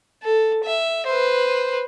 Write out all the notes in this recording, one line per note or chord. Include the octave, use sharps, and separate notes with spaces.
A4
E5
B4 C5